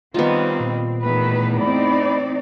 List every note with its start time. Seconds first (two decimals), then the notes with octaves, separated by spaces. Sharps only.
0.14 D#3 G3 B3 C4 D#4 F4
0.60 A#2
1.03 E2 A2 D#3 E3 B4
1.61 C4 D#4 D5 B5